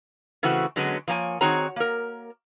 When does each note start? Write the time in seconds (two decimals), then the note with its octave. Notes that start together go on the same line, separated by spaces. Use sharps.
0.43 C#3 E3 A3 C4 F#4
0.76 D3 F#3 G#3 B3 C#4
1.08 F3 A#3 C#5 G#5
1.41 D#3 C4 F#4 G#4 C#5 A#5
1.76 A#3 A#4